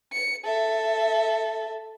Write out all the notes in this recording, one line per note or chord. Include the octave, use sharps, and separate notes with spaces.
C#7
A4 E5